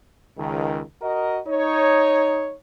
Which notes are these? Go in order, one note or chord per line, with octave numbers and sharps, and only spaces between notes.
C#2 D#3
F#4 A#4 D#5
D#4 C#5